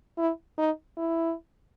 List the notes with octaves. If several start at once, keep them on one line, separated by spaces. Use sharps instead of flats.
E4
D#4
E4